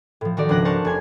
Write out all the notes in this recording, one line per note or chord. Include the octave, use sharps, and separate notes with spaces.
A2 F3
D#3 D#4 F#4 A4 D5
G#1 C#2 D4 F#5 F#6 A#6
A#4 C5 F#5 A5 C#6
F1 D4 G#5 G#6